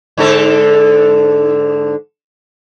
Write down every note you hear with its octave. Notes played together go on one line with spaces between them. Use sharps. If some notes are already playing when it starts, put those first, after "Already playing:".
G#2 D3 A4